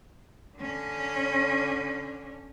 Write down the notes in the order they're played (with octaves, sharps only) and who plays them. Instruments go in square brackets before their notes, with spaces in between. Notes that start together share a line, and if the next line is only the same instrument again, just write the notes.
[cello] D3 C#4